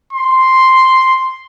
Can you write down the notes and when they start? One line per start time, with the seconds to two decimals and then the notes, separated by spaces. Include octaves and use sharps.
0.13 C6